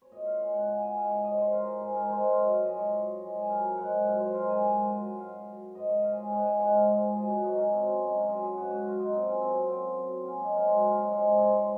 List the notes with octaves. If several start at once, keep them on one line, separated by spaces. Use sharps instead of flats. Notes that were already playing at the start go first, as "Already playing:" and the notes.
C#5
A#2 D#5
F5
G#3 F#5
F#5
A#2 G#5
G#5
G#3 F5
C#5
G#2 D#5
C5
F3 G#3 A#4
A#4
G#2 G#4
A#4
F3 G#3 C5
C#5
F5
F#2 D#5
F5
F3 G#3 D#5
C#5
F#2
F3 G#3
G#4
F#2 A#4
F5
F3 G#3 F#5
F#5
F#2 F5
C5
F3 G#3 A#4
G#5
G#2 F#5
F#3
G#2 F5
F#3
G#2 D#5
C#5
F3 G#3 F5
G#5
G#2 F#5
G#5
F3 G#3 F#5
F5
G#2
D#3 F#3 G#4
F#4
G#2 D#4
C#4
D#3 F#3 C4
C#4
G#2 D#4
F4
F#3 G#4
G#4
G#2 F#4
F#4
F#3 F4
D#4
A#2 C4
C#4
F#3 C4
C#4
A#2 C4
F#3
A#2 C#4
D#4
F3 G#3 F4
F#4
A#2 C#5
F5
D#5
F3 G#3 C#5
C5
G#2 C#5